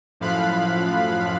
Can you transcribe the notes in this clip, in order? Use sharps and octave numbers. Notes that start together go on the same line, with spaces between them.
F#2 A2 F3 F5 B5 F#6